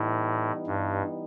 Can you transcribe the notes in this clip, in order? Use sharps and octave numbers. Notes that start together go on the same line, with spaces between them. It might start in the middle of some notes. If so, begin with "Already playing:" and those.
Already playing: A2 E3 G3 B3 D#4
G2